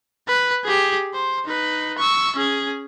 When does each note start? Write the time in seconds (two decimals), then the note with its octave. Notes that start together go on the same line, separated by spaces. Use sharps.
0.28 B4
0.64 G4 G#4
1.14 C5
1.45 D#4 B4
1.98 C#6 E6
2.36 C#4 G#4